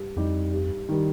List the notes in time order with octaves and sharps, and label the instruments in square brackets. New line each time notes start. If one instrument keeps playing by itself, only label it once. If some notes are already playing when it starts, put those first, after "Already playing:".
Already playing: [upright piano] G2
[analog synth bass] F2 [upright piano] G3 D#4 G4
[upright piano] G2
D#3 G3